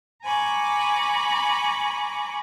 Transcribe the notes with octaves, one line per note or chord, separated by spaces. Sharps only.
G#5 A#5 B5 C#6 D6